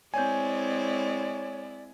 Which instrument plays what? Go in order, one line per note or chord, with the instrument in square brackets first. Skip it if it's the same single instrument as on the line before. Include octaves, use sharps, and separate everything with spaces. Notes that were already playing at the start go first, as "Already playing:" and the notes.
[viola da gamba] G#3 C4 E4 [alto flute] C#5 [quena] D5 [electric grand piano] G#5 G6